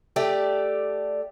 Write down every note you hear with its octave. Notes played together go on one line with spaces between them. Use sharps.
A3 G4 D5